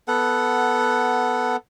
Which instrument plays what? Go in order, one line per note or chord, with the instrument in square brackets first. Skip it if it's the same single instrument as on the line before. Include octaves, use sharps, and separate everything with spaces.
[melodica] B3 A4 F#5